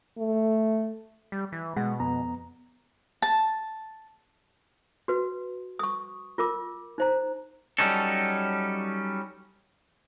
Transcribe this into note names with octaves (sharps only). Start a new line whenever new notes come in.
A3
G3
E3
B2 G#3 F#5
F2 B3 A#5
A5
F#4 B4
C#6 D#6
F4 A#4 D6
D#4 C5 A#5
F#3 G3 C#4 D#4 A4